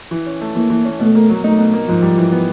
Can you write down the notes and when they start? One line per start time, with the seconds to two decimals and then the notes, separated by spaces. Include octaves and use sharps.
0.11 E3
0.26 C#4
0.41 A3
0.55 E3 A#3
0.70 E3
0.85 C#4
0.99 B2 A3
1.15 A#3
1.30 F#3
1.44 A3 D#4
1.58 B2
1.74 A#3
1.88 G#2 F3
2.02 G3
2.17 E3
2.32 B3